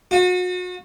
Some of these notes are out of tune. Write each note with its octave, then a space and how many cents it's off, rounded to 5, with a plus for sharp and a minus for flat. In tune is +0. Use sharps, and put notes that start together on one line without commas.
F#4 -35